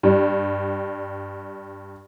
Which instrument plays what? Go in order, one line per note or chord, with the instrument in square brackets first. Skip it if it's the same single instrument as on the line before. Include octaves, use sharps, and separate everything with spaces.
[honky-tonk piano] G2 G3